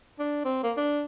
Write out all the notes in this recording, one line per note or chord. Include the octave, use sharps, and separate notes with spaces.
D4
C4
A#3
D4